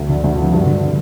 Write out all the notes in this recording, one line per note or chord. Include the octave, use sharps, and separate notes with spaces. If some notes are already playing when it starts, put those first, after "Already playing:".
Already playing: D2
D3
D2
F3
G2
D3